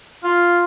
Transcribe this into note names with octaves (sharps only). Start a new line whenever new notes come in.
F4